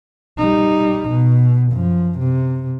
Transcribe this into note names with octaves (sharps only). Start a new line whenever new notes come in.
G3 D#4
B2
F#2 F3
C3